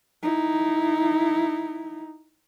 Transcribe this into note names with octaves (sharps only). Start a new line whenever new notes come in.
D#4 E4